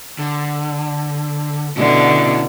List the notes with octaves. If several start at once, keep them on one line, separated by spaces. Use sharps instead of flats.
D3
B2 D3 C#4 E4